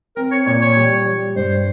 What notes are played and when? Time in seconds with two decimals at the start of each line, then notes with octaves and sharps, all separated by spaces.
0.16 C4 A#4
0.31 C#5
0.46 A#2 C#5
0.61 C#5
0.77 G3
1.06 G3
1.36 G2 C5